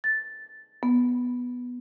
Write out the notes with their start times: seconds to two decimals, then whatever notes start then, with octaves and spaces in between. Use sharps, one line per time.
0.04 A6
0.83 B3